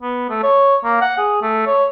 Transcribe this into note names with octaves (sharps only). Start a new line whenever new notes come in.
B3
A3
C#5
A#3
F#5
G#4
A3
C#5